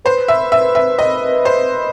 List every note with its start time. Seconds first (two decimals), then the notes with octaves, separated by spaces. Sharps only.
0.05 B4 C5
0.28 E5
0.52 E5
0.75 E5
0.99 D#5
1.45 C5